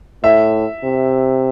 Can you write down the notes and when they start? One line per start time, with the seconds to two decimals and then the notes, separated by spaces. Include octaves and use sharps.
0.23 A2 E5
0.84 C3